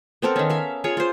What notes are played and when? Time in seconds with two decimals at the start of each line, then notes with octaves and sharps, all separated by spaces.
0.22 B3 C4 A4 A#4
0.36 D#3 C#4
0.50 E5 F5
0.84 F4 G#4 C#5
0.97 F4 C5